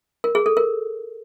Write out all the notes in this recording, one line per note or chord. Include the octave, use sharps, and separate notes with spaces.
A#4
G#4
A4
A#4